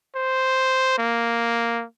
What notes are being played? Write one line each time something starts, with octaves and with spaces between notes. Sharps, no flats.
C5
A#3